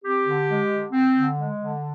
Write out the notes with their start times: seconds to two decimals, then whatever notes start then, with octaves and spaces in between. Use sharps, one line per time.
0.04 C4 G4
0.26 D3
0.49 G#3
0.71 D3
0.93 C4
1.16 D3
1.38 G#3
1.61 D3